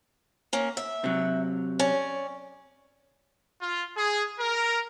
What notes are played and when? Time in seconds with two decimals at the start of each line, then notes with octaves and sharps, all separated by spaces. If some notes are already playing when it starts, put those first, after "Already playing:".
0.53 A#3 C#4
0.77 E5
1.04 C3 F#3
1.79 C#4 D5
3.62 F4
3.97 G#4
4.40 A#4